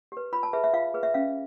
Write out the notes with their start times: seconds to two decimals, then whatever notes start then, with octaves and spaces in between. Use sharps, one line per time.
0.12 G4 B4
0.33 F4 B5
0.43 A5
0.53 G#4 B4 E5
0.64 E5
0.74 F4 F5
0.94 G#4 B4
1.03 E5
1.14 C#4 F5